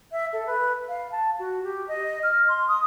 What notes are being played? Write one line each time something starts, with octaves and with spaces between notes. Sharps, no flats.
E5
A4
B4
F5
A5
F#4
G4
D#5
F6
C6
D#6